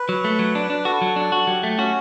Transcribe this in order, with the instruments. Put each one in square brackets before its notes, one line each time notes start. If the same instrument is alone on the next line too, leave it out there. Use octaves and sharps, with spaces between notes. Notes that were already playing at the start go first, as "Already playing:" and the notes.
Already playing: [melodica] B4
[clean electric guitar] F#3
A3
F#3
D4
D4
[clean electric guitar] F#4 [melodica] A4
[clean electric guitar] F#3
D4
F#4
[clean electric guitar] F#3 [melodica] G4
[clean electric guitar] A3
[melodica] C#4 [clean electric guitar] F#4